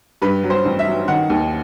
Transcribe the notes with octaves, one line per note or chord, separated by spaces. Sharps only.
G2 B4
F#3
C5
A1
E5
F#3
D#3 F#5
D#2